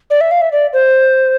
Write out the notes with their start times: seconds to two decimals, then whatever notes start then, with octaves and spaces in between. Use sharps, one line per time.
0.10 D5
0.21 E5
0.31 F5
0.41 E5
0.52 D5
0.73 C5